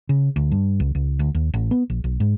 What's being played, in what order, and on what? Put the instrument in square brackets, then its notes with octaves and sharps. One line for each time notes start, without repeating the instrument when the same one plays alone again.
[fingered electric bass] C#3
D2
G2
C#2
C#2
D2
D#2
A1
B3
A#1
B1
G#2